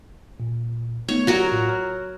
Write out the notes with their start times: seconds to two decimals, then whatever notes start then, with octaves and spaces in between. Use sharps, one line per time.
0.40 A#2
1.08 A3 B3 D#4 C#5
1.27 F#3 F#4 G4 A#4 C#5 D5
1.52 A2 F4
1.69 C#5 A#5 F6